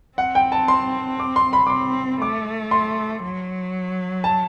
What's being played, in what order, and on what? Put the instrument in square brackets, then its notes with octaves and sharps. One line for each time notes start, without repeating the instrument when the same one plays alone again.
[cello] C4 [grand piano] F#5
[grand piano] G5
A5
C6
D6
C6
B5
D6
[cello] C4 [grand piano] C6
[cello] A3 [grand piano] D6
[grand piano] C6
[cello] F#3
[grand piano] A5